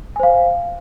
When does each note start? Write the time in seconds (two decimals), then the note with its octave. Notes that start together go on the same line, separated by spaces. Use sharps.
0.16 G#5
0.20 C5
0.23 F5